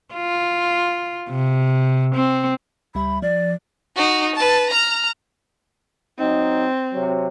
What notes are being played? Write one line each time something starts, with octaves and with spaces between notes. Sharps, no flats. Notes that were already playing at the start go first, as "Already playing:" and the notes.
F4
C3
C4
C#2 G3 E5 B5
F3 D5
D#4 F#4
B4 A5
A#5 F6
F#3 C4 D#4
C3 F#3